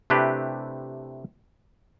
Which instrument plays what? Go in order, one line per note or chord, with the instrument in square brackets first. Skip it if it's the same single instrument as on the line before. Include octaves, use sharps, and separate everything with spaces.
[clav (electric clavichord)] C3 A3 D4 E4 G4 B4